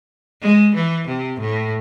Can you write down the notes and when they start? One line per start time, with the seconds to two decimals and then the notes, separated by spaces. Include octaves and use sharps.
0.42 G#3
0.75 E3
1.07 C3
1.40 A2